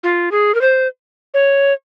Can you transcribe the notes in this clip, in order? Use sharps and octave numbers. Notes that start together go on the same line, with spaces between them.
F4
G#4
A#4
C5
C#5